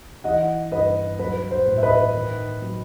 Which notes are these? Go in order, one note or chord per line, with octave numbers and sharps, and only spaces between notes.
E3 D#5 F#5
G2 B4 D#5
F#3 B4
C5
A2
E5
B4 D#5
D#3
F#3